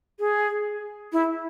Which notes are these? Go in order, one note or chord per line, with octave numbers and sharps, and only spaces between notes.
G#4
E4